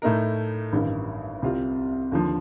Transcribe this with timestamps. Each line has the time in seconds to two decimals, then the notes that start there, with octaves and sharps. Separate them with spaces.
0.02 A2 A3 D#4 A#4
0.73 A1 G2 D#3
1.42 C2 C3 G3 C4 F4
2.12 D#2 D3 F3